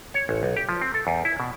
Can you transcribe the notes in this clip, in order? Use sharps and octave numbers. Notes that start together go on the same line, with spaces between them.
C#5
A1
B1
G4
F3
C4
A4
E2
E4
B2